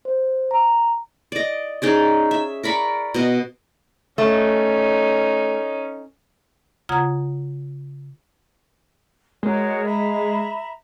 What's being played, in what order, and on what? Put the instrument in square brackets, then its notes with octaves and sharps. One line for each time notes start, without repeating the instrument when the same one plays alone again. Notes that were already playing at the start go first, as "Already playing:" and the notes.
[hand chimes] C5
A#5
[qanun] D5 D#5
C#4 D#4 G#4 D5
E5
A#4 D5 B5 C#6
B2 D#5
[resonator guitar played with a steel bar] A3 [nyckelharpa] C#4 D#4
[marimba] C#3 F4 F#5 A#5 D#6 G#6
[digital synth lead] G#3 [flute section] F#4 A#4 C#5
[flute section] E5 A#5 B5